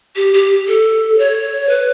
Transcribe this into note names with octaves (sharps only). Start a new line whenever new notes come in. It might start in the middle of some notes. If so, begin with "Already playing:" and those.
G4
G4
A4
C#5
B4